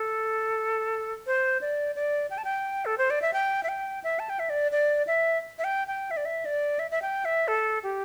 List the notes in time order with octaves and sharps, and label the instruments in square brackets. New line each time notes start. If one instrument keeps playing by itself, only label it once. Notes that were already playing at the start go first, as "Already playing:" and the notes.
Already playing: [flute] A4
C5
D5
D5
G5
A5
G5
A4
C5
D5
E5
G5
E5
G5
E5
A5
G5
E5
D5
D5
E5
E5
G5
G5
E5
D5
E5
D5
E5
E5
G5
E5
A4
G4